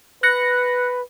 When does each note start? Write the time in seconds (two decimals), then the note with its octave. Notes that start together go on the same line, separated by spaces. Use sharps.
0.23 B4 F#6 A#6 C#7